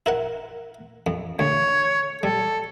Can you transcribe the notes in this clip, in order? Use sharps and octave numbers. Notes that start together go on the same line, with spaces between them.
E4 A#4 F#5
F2
D2 C#5
G3 A4